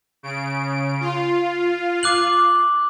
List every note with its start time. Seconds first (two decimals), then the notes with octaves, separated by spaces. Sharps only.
0.23 C#3 D7
1.00 F4
2.03 D6 F#6 F#7